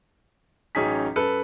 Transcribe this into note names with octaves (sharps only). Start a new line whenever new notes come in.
A1 F#3 C#4 D#4 G#4 B6
F#2 A4 B4